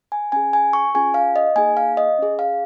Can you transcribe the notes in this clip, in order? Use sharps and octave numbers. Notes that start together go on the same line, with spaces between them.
G#5
C#4 G#4 G#5
G#5
C#6
C#4 F4 G#4 G#5
F5
D#5
A#3 D#4 G#4 G#5
F5
D#5
C#4 G#4
F5